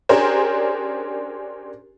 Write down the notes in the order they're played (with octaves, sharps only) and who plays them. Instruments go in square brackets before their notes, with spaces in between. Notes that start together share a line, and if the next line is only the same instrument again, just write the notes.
[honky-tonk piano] C#4 D4 G4 G#4 A#4 C5